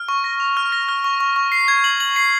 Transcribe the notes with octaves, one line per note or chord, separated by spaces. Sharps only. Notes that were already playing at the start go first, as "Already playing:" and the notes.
Already playing: F6
C#6
A#6
F7
F6
A#6
F6
C#6
C#6
C#6
C7
G#6
F#7
F#7
C7